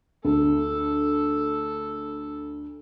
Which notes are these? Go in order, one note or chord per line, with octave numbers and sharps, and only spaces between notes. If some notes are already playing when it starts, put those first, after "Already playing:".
D2 A4